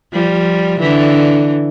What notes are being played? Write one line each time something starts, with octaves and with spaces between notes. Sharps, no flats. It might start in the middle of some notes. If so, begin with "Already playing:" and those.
F3 G3
D3 E3